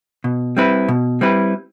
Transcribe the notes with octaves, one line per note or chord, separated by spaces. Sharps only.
B2
G3 C4 E4 B4
B2
G3 C4 E4 B4